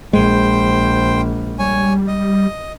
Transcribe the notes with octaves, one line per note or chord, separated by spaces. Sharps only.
A#1 G#3 C5 G5
G3 C#5 G#5
D#5